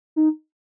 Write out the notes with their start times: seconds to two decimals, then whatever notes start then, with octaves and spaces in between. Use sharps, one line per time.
0.16 D#4